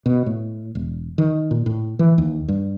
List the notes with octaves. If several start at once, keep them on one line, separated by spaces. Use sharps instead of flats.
B2
A2
E1
D#3
A#2
A2
E3
D#2
G2